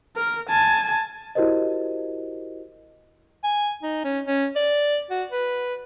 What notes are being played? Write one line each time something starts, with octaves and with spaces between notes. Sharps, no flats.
A#4
G#5 A5
E4 F#4 G4 A#4 C5 D#5
G#5
D#4
C#4
C#4
D5
F#4
B4